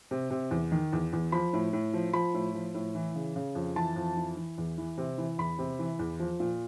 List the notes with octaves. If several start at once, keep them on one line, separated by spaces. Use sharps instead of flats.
C3
C3
E2
D#3
E2
E2
F3 B5
A2
A2
F3
F3 B5
A2
F3
A2
E3
C#3
C#3
F2
E3 A5
F2
E3
E3
E2
E3
C3
E3
E2 B5
C3
E3
E2
F3
A#2